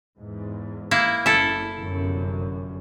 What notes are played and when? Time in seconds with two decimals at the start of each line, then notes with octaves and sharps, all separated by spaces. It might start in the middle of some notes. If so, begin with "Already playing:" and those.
0.18 E2 G#2
0.91 A#3 E4
1.26 F#1 E4 A4
1.77 G1 F#2 C3